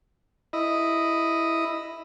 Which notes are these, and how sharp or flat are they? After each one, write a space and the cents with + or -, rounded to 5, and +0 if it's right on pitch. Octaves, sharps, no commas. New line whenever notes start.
E4 +0 D#5 +0